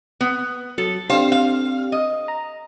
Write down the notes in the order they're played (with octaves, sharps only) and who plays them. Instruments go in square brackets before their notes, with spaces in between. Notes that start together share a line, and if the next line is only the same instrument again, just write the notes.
[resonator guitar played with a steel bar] B3
[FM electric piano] F#3 [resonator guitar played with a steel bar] A4
[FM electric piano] C4 D4 G4 [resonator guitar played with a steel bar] C5 F5
[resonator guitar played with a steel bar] F5
D#5
[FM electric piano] A#5